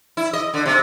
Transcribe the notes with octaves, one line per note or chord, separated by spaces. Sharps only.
E4
D#5
D3
C3